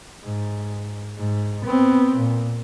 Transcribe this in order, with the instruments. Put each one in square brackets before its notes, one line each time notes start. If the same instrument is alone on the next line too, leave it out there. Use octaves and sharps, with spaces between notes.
[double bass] G#2
G#2
B3 C4
A#2